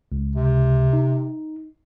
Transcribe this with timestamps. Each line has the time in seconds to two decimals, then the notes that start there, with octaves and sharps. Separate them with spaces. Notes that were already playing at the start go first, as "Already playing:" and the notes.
0.12 C#2
0.36 C3
0.93 D#4